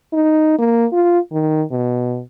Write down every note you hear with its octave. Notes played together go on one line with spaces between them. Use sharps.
D#4
A#3
F4
D#3
B2